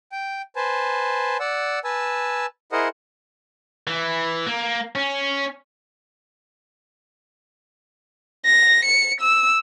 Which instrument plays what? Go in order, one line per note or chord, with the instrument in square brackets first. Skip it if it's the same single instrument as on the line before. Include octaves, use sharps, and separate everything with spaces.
[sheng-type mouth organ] G5
B4 C5 G#5 A5
D5 F#5 E6
B4 G#5 A5 E6
E4 G#4 A#4 C5 D#5 F#5
[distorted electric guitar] E3
A#3
C#4
[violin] A#6
C#7
E6